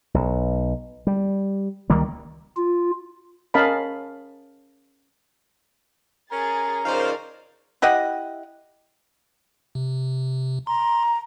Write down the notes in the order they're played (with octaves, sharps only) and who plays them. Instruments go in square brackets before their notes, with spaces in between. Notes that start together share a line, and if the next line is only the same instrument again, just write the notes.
[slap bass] B1
G3
C#2 D#3 G3 A#3
[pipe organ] F4
[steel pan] C#4 A#4 D#5 F5 A5 B5
[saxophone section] C#4 A#4 [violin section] G#4 A6 [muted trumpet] A#5
[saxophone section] C#3 F3 D#4 [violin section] A#4 D5 [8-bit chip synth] C5 F5
[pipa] E4 G4 D#5 F#5
[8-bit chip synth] C3
[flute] A#5 [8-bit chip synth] C6